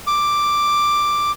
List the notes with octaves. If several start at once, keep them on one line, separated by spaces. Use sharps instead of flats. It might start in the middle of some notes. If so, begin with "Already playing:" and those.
D6